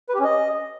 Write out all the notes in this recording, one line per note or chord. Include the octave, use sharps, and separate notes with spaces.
B4
G4
C#4
D#5